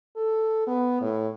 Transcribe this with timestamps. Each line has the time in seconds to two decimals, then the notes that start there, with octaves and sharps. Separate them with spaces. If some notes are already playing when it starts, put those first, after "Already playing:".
0.16 A4
0.67 B3
1.01 A2